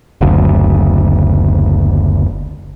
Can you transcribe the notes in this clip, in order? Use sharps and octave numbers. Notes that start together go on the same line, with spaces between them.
F#1 D2